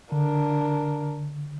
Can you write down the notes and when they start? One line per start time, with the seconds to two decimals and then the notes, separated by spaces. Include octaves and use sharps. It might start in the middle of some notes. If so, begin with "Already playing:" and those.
0.12 D3 D4 A#4